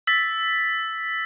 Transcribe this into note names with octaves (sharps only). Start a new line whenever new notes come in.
E6 A6 B6